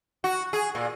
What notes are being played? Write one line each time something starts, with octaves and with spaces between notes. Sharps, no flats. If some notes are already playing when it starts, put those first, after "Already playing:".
F#4
G#4
A#2